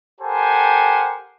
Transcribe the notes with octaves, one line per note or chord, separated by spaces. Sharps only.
G4 A4 A#4 C5 F#5 G#5